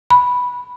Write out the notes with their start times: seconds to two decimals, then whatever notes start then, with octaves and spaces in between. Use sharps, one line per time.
0.10 B5